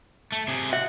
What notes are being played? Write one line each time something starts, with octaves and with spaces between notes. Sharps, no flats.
A3
C3 G#4
E5 F#5